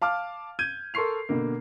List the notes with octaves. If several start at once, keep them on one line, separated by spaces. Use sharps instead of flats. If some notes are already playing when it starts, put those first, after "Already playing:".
F5 A5 D6 F6
G6 G#6 D#7
A4 A#4 C6 C#6 C7 F7
B2 D3 A#3